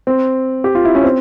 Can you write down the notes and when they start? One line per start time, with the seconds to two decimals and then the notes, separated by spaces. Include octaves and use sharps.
0.07 C4
0.64 G4
0.75 F4
0.85 E4
0.95 C#4
1.04 C4